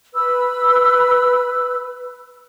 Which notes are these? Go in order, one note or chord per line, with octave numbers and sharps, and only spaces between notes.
B4 B5 E6